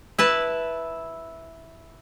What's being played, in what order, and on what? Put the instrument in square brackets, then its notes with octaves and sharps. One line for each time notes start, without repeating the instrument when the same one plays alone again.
[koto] E4 B4 A5